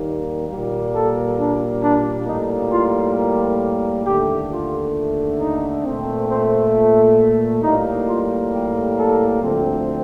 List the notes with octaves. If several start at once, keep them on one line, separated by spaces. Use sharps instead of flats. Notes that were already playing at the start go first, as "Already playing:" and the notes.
Already playing: D#2 D#3 G3 A#3
A#2 G3 A#3
A4
D4
D4
A2 G3 A#3 D#4
F4
A#4
D#2 D3 A3 G4
F4
D#4
A#2 A3 C4
C4
A2 G3 A#3 D#4
F4
G4
A4
D2 D3 F3 A3 C4